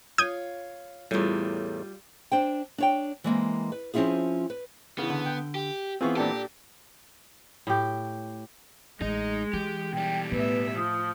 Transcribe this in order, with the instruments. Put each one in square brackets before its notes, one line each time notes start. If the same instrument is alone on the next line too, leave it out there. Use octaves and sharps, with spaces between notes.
[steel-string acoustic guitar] F4 C#5 F5 [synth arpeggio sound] D#6 G6 G#6
[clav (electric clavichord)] E2 A2 [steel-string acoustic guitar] G3 F4
[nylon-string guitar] D4 C5 G5
D4 C#5 G5
E3 G#3 A#3 C4
B4
F3 C4 C#4 E4 F4 G#4
B4
[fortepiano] C#3 E3 [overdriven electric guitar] B3
[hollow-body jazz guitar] D3
[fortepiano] G5
[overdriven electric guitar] G4
[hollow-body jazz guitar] E3 B3 C4 [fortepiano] F4 G#4 C#6
[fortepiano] A#2 D4 A4 [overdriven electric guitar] G4
[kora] A2 G4
[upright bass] A1 [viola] G#3 [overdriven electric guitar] D#4 D#5
[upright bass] E3 [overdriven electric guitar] G4
[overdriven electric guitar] B2 G3 [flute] G5
[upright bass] A2 [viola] B3 E5 [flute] B4
[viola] F3 [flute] D#6